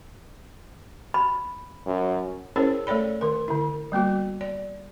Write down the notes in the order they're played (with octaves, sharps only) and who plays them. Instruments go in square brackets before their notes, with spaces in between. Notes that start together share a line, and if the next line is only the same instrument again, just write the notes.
[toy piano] B5
[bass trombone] F#2
[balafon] C#4 E4 G#4 A#4 C5 C#5
A3 A4 C#5 D5 B5
D#3 A#4
D3 E4
G3 A#3 B3 F#4
D5